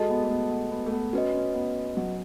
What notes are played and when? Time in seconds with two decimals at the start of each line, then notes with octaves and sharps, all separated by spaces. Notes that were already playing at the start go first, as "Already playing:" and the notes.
Already playing: G#3 F#4 A4 D#5 A5
0.10 B3
0.23 A3
0.31 B3
0.51 B3
0.71 B3
0.86 A3
0.92 B3
1.13 C#4 F#4 B4 D#5
1.34 C#4
1.54 B3
1.97 F#3